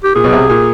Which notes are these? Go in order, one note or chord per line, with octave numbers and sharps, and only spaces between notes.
G4
A#2 G#4
B1 B2
C2 C3
A#2